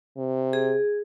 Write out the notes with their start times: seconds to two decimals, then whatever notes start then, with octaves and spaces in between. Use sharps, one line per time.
0.17 C3
0.53 G#4